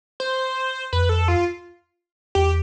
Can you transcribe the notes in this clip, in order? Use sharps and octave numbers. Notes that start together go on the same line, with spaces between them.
C5
F2 B4
A4
F4
E2 G4